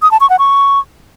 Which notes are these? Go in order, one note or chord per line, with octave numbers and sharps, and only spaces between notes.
D#6
A5
C#6
F#5
C#6